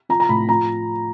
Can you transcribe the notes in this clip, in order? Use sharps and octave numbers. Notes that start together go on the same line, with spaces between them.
F3 A#5
A#5
A2 B5
F3 A#5